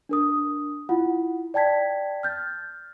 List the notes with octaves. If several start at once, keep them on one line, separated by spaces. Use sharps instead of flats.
D4 A#4 D#6
E4 F4 F#5
D5 G5 A5 G#6 B6
F6 G6 A6